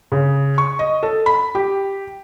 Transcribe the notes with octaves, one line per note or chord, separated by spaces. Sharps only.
C#3
C#6
D#5
A4
B5
G4